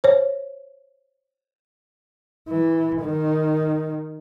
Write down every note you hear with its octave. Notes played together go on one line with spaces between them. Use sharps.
C5 C#5
E3
D#3